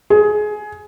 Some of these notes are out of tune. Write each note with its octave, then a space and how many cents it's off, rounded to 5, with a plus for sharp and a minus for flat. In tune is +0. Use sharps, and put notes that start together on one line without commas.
G#4 +20